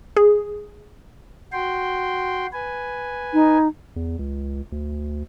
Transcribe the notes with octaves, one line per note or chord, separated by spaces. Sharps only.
G#4
F#4 G5 C6
B4 G#5
D#4
E2
C#2
D2